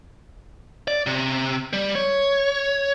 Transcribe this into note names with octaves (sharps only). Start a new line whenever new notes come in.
D5
C3
G3
C#5